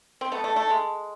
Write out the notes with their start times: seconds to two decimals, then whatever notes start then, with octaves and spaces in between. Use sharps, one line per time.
0.21 C4
0.32 A3 B3
0.44 A3
0.56 A3
0.70 G#3